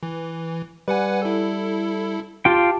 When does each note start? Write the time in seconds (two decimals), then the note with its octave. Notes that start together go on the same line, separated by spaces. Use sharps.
0.03 E3
0.88 G3 B4 F#5 G#5
1.22 E4 A4
2.45 F4 G4 G5 A5